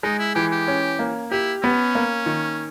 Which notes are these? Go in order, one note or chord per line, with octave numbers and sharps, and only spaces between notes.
G#3 D#4
E4
E3 G4
G4
C#4
A#3
E4 G4
B3 C#4
A#3
D#3